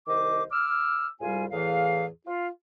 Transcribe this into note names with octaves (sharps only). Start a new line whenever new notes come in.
C2 D#3 C5 D#5 D6
D6 E6 F6
C2 G#2 G3 F4 F5 G#5
E2 A2 E3 G#4 F5
F4